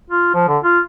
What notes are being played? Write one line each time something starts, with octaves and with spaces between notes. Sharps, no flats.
F4
F3
D3
F4